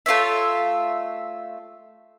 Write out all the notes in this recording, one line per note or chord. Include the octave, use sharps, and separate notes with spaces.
A3 F4 C#5 E5